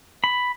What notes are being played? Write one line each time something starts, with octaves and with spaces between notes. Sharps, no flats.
B5